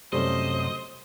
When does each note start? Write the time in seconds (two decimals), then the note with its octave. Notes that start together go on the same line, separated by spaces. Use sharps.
0.13 F#2 C3 G3 A3 C#4 C5 D#5